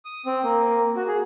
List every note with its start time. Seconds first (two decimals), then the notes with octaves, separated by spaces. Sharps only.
0.05 D#6
0.26 C4
0.44 A#3
0.96 F#4
1.07 G#4